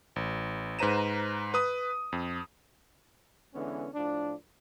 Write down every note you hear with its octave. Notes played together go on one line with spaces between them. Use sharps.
A1
G#2 B4 C5 A#5 D#7 E7
B4 D#6
F2
D3 E3 G#3 B3 C#4
A2 F3 D4